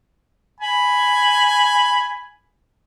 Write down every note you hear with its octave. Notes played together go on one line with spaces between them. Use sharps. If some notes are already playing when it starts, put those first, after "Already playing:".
G#5 B5